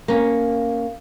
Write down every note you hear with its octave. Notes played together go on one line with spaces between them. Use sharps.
A#3 C#4